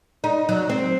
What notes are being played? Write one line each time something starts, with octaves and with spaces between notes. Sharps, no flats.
D#4
F#3
C4